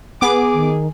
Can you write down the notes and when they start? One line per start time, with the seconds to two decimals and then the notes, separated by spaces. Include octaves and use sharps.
0.21 B3 G#4 D6
0.53 D#3